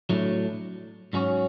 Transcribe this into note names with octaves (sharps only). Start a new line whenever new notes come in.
A2 F#3 A3 D4
G#2 F#3 C#4 F#4 C#5